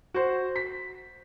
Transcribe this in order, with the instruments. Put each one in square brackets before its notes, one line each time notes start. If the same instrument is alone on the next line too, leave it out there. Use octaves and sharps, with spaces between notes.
[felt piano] F#4 C5
B6